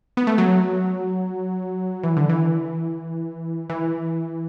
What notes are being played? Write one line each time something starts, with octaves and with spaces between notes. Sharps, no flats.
B3
A3
F#3
E3
D3
E3
E3